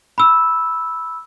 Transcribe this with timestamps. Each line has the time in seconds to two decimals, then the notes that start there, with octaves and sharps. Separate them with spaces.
0.18 B5 E6